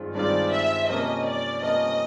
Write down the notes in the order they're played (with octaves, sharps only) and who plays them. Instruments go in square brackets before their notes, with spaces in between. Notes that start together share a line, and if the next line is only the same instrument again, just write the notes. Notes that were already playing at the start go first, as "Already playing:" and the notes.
Already playing: [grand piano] G2 D#3 G#3 C4 F4
[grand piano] G2 D#3 G#3 C4 F4 [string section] D5
[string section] E5
[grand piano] C3 F3 A#3 C#4 [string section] D#5
[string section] D5
[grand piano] C3 F3 A#3 C#4 [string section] D#5